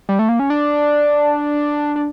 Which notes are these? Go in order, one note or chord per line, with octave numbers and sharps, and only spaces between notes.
G3
A3
A#3
C#4
D4
D4